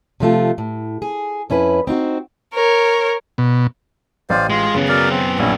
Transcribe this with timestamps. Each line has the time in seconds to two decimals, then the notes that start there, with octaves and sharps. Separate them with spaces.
0.20 C3 F3 A3 F4
0.58 A2
1.02 G#4
1.50 F2 C#4 E4 B4
1.87 C4 D#4 F4 F#4
2.55 A#4 C#5
3.38 B2
4.30 A1 C5 D5 F5
4.50 G#3 F4
4.74 F#2 C#3 B3
4.88 F#3 A#4 D5
5.09 C4
5.39 A#1 C#4 E4